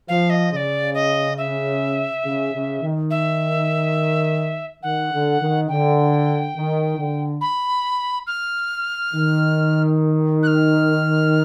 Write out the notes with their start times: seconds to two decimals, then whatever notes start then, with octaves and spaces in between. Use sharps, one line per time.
0.08 F3 F5
0.30 D#5
0.51 C#3 D#5
0.56 D5
0.94 D#5
1.38 E5
2.24 C#3
2.53 C#3
2.81 D#3
3.10 E5
4.83 D#3 F#5
5.12 D3
5.40 D#3
5.69 D3 G5
6.55 D#3
6.98 D3
7.41 B5
8.27 F6
9.13 D#3
10.43 F#6
10.47 F6